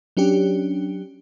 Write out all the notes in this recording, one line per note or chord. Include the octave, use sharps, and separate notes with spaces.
F#3 C#4 D4 G4